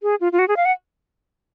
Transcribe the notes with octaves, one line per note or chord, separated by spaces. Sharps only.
G#4
F4
F4
F#4
G#4
F5
F#5